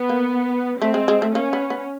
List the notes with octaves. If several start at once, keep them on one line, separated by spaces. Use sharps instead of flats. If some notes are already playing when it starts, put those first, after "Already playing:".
Already playing: B3
A#3
A3 C4
G#3
G#3
A3
A#3 C#4
B3
B3